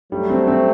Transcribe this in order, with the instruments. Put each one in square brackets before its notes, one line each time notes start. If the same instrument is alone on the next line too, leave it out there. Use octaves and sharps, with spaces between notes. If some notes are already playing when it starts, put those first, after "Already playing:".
[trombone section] F#3 A3 [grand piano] G3
[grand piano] C4
C4